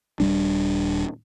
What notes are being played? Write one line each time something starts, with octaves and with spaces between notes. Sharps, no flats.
D#1 G#2 G3 D4